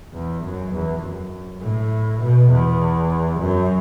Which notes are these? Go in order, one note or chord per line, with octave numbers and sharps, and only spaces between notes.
E2
F#2
E2
F#2
A2
B2
E2
F#2